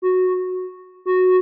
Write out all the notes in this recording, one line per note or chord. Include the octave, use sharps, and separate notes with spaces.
F#4
F#4